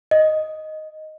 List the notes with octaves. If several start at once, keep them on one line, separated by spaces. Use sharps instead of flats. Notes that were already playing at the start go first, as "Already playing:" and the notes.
D#5